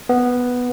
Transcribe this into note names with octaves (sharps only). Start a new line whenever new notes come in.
B3